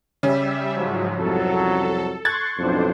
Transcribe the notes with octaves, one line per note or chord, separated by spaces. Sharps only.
C#3 G3 C#4 E5
G#2 F3 F#3
C2 F2 F#3 A4
C6 C#6 F#6 G#6 A6
B1 F2 A2 D4 C5